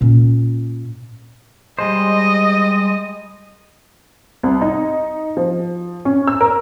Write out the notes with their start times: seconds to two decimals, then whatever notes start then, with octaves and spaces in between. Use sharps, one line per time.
0.01 A#2 C#4
1.79 G3 G#3 C5 D#5
4.43 C2
4.61 D#4
5.37 F3
6.05 C#4
6.27 E6
6.41 A#4